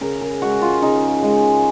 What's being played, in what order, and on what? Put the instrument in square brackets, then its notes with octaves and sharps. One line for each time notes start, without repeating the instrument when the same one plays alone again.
[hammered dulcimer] C#3 A#4
A#4
G#3 F#4
F4
C#3 D#4
G#3